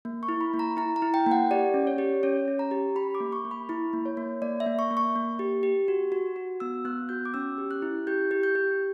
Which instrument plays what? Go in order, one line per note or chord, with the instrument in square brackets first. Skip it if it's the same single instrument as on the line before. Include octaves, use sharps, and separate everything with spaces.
[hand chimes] A#3
C#6
E4
B5
A#3
A#5
E4 A#5
A#5
E4
G5
A#3 F#5
G4 D5
C#4
C#5
G4
C#4 C#5
C#4
A#5
G4
G4 B5
D6
A#3
C#6
A#3
B5
E4 B5
A#3
C#5
A#3
A#3 D5
E5
A#3
C#6
A#3
C#6
A#3
G4
G4
F#4
F#4
F#4
B3 E6
B3 F#6
F#4 G6
D6
C#4 E6
G4
F#6
E4
G4 G6
G4
G6
G4